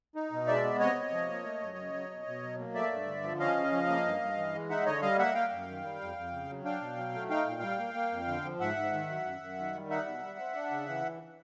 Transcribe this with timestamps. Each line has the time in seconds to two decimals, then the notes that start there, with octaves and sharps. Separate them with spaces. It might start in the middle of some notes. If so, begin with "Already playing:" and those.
0.16 D#4
0.32 B2
0.47 G#3 D5 E5
0.64 B3
0.79 C3 C#5 D#5
0.96 C3
1.12 F3
1.29 A#3
1.45 A3
1.61 F#2
1.77 C#3
1.94 F#3
2.11 B2
2.26 B2
2.43 F#3
2.59 A#3
2.75 A3 D5 E5
2.92 G2
3.07 D3
3.23 F3
3.39 C#4 D#5 F5
3.57 C#3
3.72 F3
3.89 A#3
4.05 G2
4.21 G2
4.37 E3
4.54 G#3
4.70 D#4 E5 F#5
4.86 D3 C#5 D#5
5.02 G3 D#5 F5
5.18 A#3 E5 F#5
5.34 A#3 F5 G5
5.52 F#2
5.68 D#3
5.83 G3
6.00 F2
6.17 F2
6.32 C#3
6.49 F#3
6.65 D4 F5 G5
6.81 B2
6.97 F#3
7.14 A3
7.30 D#4 F5 G5
7.46 A#2
7.62 G3
7.79 A#3
7.94 A#3
8.12 F2
8.27 D3
8.44 F3
8.59 G#2 E5 F#5
8.76 G#2
8.93 D#3
9.09 F#3
9.25 F#2
9.41 F#2
9.58 D#3
9.74 G3
9.90 D#4 E5 F#5
10.06 B2
10.22 G3
10.38 C4
10.55 D4
10.71 C#3
10.88 E3